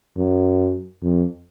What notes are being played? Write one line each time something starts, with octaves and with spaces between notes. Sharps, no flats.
F#2
F2